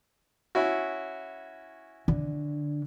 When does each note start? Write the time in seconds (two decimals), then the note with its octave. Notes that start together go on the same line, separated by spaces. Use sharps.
0.55 C#4 E4 F#4
2.08 D3